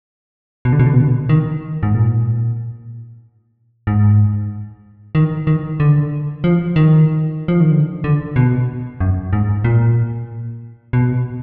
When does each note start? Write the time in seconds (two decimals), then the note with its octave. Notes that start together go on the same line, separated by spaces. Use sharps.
0.65 B2
0.73 D3
0.79 B2
0.86 D3
0.93 B2
1.01 D3
1.08 B2
1.29 D#3
1.83 G#2
1.94 A#2
3.87 G#2
5.15 D#3
5.47 D#3
5.80 D3
6.44 F3
6.76 D#3
7.48 F3
7.60 D#3
7.71 D3
8.04 D3
8.36 B2
9.00 F#2
9.33 G#2
9.64 A#2
10.93 B2